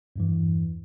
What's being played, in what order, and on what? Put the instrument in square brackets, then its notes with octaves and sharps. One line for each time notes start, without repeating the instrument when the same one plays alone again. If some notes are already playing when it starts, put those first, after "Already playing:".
[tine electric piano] E2 G2 E3